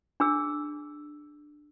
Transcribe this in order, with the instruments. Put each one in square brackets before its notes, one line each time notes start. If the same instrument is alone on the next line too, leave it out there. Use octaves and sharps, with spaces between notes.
[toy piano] D4 G#4 E6